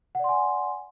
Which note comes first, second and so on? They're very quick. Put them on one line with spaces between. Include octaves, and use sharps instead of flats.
F#5 D5 C6 G#5